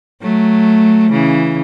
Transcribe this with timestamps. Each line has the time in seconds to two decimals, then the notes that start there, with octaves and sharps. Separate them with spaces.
0.22 F#3 A3
1.11 C#3 E3